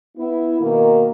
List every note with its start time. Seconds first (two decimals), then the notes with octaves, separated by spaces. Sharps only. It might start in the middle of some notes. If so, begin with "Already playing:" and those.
0.17 B3 E4
0.59 B2 D#3 A#3